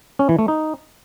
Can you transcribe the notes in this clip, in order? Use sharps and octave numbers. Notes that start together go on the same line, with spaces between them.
C#4
E3
A3
D#4